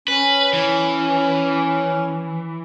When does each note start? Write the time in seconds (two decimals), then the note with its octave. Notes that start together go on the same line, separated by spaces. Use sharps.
0.08 C#4 B4
0.53 E3